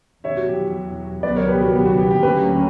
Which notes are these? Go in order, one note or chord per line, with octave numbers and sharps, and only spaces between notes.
E2 B2 F#3 C#5 E5
F#4
G4
C#2 B2 F#3 B3 B4 D5
A#4 C#5
G4 B4
F#4 A#4
G4
F#4
G4
G4
D2 D3 F#3 A#3 C#4 G4 B4